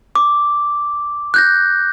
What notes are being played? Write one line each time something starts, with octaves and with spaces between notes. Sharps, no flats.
D6
F#6 G6 A#6